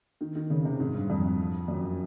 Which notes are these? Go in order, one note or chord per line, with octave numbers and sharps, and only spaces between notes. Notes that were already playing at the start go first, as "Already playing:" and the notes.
D#3
D#3
C#3
C3
G#2
G2
F2
F#2